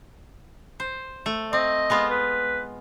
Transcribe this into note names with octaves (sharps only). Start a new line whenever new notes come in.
C5
A3
C4 D#5
G#3 B3 F4
B4